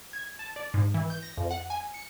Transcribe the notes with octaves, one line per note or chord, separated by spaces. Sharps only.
G#6
A5
D5
G#2
E3
G6
A#6
F2
F#5
G#5
C#7